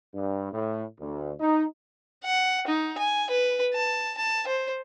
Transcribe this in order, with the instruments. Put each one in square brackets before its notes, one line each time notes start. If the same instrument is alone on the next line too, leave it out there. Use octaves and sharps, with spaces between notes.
[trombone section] G2
A2
D2
D#4
[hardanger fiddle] F#5
D#4
G#5
B4
A5
A5
C5